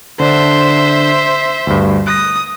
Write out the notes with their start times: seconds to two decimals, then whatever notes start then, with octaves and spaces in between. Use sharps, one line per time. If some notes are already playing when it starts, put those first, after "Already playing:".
0.20 D3 D4 C5 E5
1.67 D2 G2
2.07 D#6 F#6 A#6